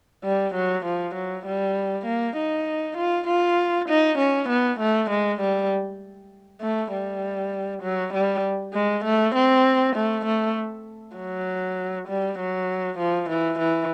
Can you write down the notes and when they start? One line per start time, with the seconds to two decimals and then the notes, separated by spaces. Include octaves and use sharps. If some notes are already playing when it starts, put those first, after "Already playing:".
0.24 G3
0.54 F#3
0.85 F3
1.14 F#3
1.46 G3
2.06 A#3
2.37 D#4
2.97 F4
3.27 F4
3.89 D#4
4.18 C#4
4.49 B3
4.80 A3
5.10 G#3
5.41 G3
6.61 A3
6.92 G3
7.82 F#3
8.14 G3
8.73 G#3
9.05 A3
9.35 C4
9.96 A3
10.25 A3
11.17 F#3
12.08 G3
12.39 F#3
12.98 F3
13.29 E3
13.59 E3